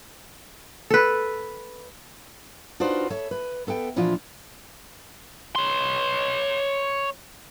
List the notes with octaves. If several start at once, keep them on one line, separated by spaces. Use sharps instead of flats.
A4 B4
D4 D#4 F4 F#4 B4 C5
A4 C#5 E5
B4
B3 A4 E5 G5
A#2 E3 F3 D4 E4 F4
C#5 C6